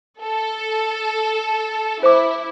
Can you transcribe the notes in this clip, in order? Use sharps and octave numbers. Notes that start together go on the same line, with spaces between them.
A4
E4 C5 D6